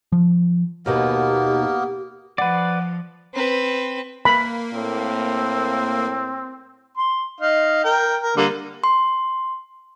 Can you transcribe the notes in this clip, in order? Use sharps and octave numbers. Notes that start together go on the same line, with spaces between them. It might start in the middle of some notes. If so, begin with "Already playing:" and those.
F3
D#2 B2 D#3 A#3 B3 G4 A#4
F3 B4 D5 F#5
C4 B4
A#3 B5
A2 C4
C6
D#4 F5
A#4 G5
A#4
D3 G3 A#3
C6